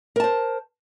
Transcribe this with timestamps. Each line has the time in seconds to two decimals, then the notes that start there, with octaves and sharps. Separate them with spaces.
0.16 A#4
0.20 A5
0.24 C5